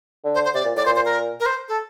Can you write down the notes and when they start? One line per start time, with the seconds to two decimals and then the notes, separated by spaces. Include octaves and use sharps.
0.24 D3
0.34 C5
0.45 C5
0.54 C3 D5
0.65 A#2
0.75 A2 D5
0.86 A#2 C5
0.96 C5
1.05 A#4
1.40 A#4
1.46 C5
1.68 A4